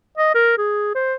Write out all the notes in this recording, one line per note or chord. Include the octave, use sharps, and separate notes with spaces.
D#5
A#4
G#4
C5